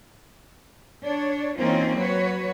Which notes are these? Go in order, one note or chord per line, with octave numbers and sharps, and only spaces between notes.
D4 C#5
E3 A#3 C4 C#4 D#4 F4
F#3 F#4 B4 C#5